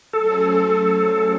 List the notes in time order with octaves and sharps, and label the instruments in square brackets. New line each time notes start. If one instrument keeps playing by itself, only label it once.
[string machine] F#3 A3 C#4 G#4 C5 [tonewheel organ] A4